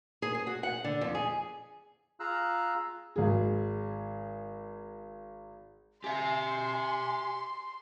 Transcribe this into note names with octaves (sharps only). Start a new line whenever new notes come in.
G#4
G#4
F#4
F#5
D3
F2
G#4
F4 G#4 F5 A#5 E6 F#6
G#1 G#4
G4 E5 G#5 C6